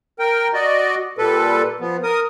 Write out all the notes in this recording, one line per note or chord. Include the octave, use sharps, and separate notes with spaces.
A#4 G5
F#4 D5 D#5
A#2 G3 A4 B4
F3 B3
A#4 D#6